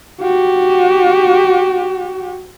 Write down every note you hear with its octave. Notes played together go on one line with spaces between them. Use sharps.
F#4 G4